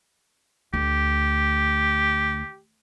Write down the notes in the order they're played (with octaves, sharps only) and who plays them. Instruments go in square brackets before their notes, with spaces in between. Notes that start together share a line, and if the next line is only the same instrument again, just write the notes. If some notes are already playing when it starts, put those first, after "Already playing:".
[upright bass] D2 [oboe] G4